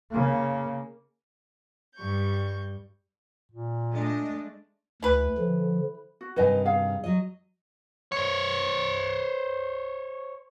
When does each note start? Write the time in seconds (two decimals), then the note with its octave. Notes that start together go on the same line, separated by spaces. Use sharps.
0.11 C#3 A#3
1.96 G2 G3 C#6 G6
3.52 A#2
3.94 G#3 A3 D4 D#5
5.02 D2 E3 B4
5.38 D3 F3
6.21 F#4
6.36 G2 C3 D#3 B4 D#5 G#5
6.66 G#4 F5
7.04 F#3 D#5
8.12 C5 C#5